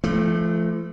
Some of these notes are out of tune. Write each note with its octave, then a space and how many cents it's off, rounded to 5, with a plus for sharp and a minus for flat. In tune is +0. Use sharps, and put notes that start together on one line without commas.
F3 -40 A3 -20